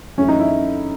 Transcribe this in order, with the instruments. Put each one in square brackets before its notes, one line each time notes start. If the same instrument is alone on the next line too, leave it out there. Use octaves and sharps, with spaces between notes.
[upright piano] F#2 E3 A3 C#4
D#4
E4